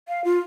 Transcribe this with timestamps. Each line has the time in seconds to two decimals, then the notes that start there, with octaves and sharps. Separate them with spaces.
0.08 F5
0.24 F4